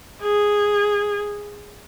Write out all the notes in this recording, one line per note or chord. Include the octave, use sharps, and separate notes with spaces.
G#4